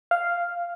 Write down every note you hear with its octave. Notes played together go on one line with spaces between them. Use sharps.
F5